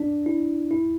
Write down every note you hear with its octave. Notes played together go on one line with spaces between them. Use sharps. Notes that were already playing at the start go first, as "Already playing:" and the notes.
Already playing: D4
E4
E4